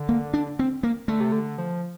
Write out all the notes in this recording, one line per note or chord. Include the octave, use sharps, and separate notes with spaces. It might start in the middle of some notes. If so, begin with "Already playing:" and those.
Already playing: D3
A#3
D4
C4
A#3
D3 A3
C3
D3
F3